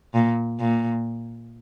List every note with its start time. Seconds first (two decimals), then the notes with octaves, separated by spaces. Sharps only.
0.14 A#2
0.60 A#2